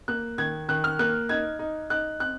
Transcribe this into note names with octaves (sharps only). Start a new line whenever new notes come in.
A#3 F#6
D#3 G#6
D#3 F#6
F6
A#3 F#6
D#4 G#6
D#4
D#4 F#6
C4 F#6